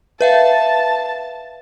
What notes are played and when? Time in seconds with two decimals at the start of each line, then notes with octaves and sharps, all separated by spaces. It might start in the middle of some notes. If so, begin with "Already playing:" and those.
0.21 B4 E5 F5 A5